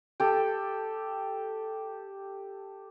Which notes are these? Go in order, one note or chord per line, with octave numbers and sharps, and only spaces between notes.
G4 A4